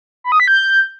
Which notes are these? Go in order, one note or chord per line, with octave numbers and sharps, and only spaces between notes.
B5
D#6
B6
G6